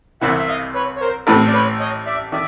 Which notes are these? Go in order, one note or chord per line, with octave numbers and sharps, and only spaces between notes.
C2 C3 E3 E5 F#5
E5
D#5 F5
B4 C#5
C#5
A#4 C5
A1 A2 E3 A3 C4 A4 B4
D5
B4 C#5
C#5 D#5
D5 E5
D#3 D5 E5